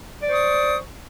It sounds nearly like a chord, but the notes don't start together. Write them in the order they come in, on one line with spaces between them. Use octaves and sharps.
D5 C5 C#6 D#6